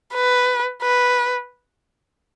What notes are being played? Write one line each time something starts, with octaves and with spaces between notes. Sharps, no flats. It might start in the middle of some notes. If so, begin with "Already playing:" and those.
B4
B4